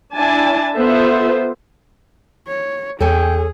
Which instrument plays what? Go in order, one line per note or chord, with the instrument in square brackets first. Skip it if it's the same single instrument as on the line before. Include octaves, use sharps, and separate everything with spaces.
[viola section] D4 E4 G#5 A5
B3 F4 A4 C5 E5
[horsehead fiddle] C#5
[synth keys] E2 [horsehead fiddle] G#4 [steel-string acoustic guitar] A4 C#5 G#5 [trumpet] G5